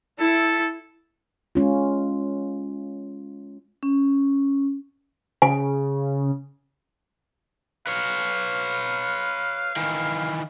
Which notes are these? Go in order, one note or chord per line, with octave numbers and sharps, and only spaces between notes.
E4 A4
G#3 C#4 F4
C#4
C#3 G#5
B4 C#5 F5
D#3 E3